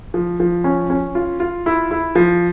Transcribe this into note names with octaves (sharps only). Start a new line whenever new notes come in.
F3
F3
C#4
C#4
F4
F4
E4
E4
F3